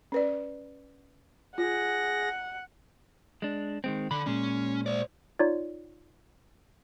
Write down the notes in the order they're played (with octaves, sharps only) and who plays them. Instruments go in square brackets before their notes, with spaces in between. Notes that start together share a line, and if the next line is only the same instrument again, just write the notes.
[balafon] C#4 B4 D5
[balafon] F4 [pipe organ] G#4 A#6 [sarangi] F#5
[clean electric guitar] G#3 D4
D#3 G#3 C4
[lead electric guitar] D3 [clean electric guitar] B5
[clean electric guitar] A#2 G#3 [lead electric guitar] C#4
[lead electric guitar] C5 D5
[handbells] D#4 F4 C#5 D5